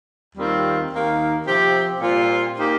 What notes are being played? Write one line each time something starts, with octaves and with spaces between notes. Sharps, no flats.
D#2 D#3 G3 C4 F4
D#2 D#3 A#3
C3 F3 C4 G4
A#2 G3 C4 F4
A#2 A#3 D#4 G4